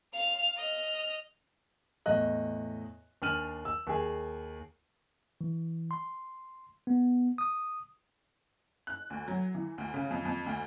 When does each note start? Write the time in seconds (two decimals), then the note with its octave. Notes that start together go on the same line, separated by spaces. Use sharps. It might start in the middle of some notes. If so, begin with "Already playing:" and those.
0.13 F5 F7
0.57 D#5 F6
2.06 E2 A2 D#5 F#6
3.22 D#2 D4 G#5 F6 D#7 F#7
3.65 E6
3.87 D#2 G#4
5.41 E3
5.91 C6
6.87 B3
7.38 D#6
8.87 F#6
9.10 D2
9.28 F#3
9.55 E3
9.78 D2
9.94 C#3
10.11 F2
10.25 F2
10.46 D2